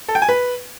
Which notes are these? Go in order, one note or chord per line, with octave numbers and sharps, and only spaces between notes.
A4
G5
G#5
B4